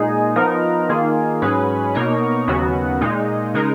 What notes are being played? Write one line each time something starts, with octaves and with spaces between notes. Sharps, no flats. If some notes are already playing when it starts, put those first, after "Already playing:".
Already playing: A#2 G#3 D#4 G#4
F3 B3 D#4 A#4
D#3 A#3 F4 G#4
G#2 F#3 C#4 G#4 B4
B2 A#3 D#4 A#4 C#5
D#2 C#3 F#3 B3 F#4
A#2 G#3 D#4
C#3 G#3 D#4 A#4